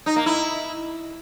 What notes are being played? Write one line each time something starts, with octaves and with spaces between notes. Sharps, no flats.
D#4
A#3
E4